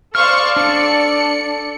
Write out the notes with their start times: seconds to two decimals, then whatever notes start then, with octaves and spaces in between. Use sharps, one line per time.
0.15 A4 C5 D5 F5 C#6 F6
0.56 D4 C#7